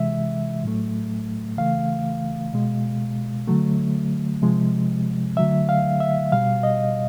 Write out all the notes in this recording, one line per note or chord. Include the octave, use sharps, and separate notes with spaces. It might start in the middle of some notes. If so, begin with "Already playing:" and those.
Already playing: C3 E3 G#3 E5
A2 F#3 A3
C#3 E3 A3 F5
B2 G#3
D3 F#3 A3
C3 F3 G#3
D3 F#3 A3 E5
F5
E5
B2 G3 F5
D#5